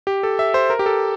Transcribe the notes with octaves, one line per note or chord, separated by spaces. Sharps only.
G4
A4
E5
C5
A#4
G4
A4